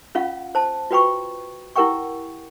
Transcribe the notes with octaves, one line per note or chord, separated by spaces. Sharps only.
C#4 F4 F5 F#5
C5 A5
F4 F#4 B4 G5 B5 C#6
E4 G4 A#4 F#5 G5 C#6